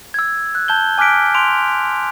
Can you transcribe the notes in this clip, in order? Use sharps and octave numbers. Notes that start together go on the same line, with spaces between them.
E6 G#6
F#6
A5 G6 G7
G#5 D6 F6 F#6 B6 D7
C6 D7 F7